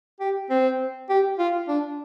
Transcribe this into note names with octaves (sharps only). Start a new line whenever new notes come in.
G4
C4
G4
F4
D4